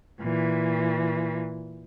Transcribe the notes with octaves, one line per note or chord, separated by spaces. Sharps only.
A#2 E3